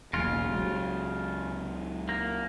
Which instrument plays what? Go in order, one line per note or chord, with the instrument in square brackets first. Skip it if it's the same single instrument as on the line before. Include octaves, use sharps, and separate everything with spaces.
[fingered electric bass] E1 B1 A#3 [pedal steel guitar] C#3 F4
[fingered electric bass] C#2 F#3 G#3
[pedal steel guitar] A#3